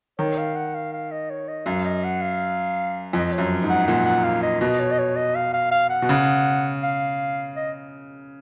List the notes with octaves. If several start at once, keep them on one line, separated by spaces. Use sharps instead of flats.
D#3 C#5
F5
F#5
F5
F5
D#5
C#5
D#5
F#2 F5
D#5
F#5
F5
F2 D#5
C#5
F#2
G#2
F#5
A#2 F#5
F#5
F5
D#5
B2 D#5
C#5
D#5
C#5
D#5
F5
F5
F5
F#5
B2
C#3
F5
D#5